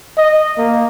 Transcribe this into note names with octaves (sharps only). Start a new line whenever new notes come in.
D#5
A#3